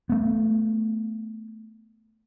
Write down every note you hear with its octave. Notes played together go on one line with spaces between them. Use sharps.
A3 B3